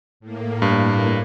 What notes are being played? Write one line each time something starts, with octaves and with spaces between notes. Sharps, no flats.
A2 A#3
G2